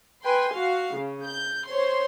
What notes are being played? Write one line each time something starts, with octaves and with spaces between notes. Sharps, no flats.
B4 G5 G#5 C6
F#4 F5
C#3
G6
C5 C#5 C6